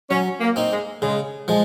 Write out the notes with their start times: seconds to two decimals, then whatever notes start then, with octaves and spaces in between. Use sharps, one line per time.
0.10 F#3 C#4
0.40 A#3
0.56 C4 D#4
0.72 G#3
1.02 C#3 G#3
1.48 F3 G#3